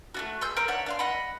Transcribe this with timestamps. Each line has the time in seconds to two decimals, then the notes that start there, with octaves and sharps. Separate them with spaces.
0.14 A3 D4 F#4
0.41 G#4 C6 E6 G6
0.57 A#4 C5 A#5 B5
0.68 D4 C#5 E5 F#5
0.86 D4 F5 C6
0.99 D#5 F#5 B5